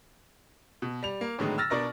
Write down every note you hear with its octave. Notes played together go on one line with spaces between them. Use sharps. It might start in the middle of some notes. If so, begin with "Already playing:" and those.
B2
G3 F7
A#3
A2 D3 D#3 F#3 G#3 B3
E6 F6 A6 A#6
B2 D4 A#4 D5 C#6 A#6